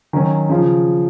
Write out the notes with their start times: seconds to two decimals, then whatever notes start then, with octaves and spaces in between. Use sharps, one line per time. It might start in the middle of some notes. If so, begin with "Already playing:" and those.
0.13 D#3 F#3 C#4
0.49 C#3 F3